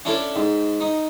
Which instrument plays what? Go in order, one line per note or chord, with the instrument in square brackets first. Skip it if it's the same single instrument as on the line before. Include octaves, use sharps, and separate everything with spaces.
[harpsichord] C#4 D4 E4 A4 C#5 D5
G#2
D#4